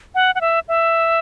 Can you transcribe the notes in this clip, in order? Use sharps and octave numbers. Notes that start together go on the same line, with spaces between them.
F#5
F#5
E5
E5